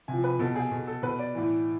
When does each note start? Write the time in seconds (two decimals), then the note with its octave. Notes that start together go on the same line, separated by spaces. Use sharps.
0.08 C3 F3 G#5
0.24 B4
0.39 B2 A4
0.56 G#4
0.71 B2
0.87 A4
1.03 B2 B4
1.19 D5
1.35 A2 E3